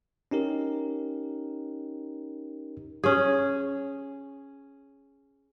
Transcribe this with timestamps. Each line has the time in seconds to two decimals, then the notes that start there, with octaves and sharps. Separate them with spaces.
0.31 C#4 D#4 G4 A#4
3.04 C#4 G#4